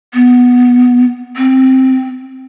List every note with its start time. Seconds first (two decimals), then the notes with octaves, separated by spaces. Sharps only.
0.14 B3
1.37 C4